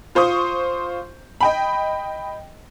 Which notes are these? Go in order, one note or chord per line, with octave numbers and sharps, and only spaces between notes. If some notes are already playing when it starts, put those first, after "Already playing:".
F4 C5 C#6 D#6
D#5 G5 B5